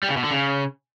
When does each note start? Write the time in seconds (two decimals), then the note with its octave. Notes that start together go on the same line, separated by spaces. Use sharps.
0.03 G3
0.10 C#3
0.17 B2
0.24 D3
0.31 C#3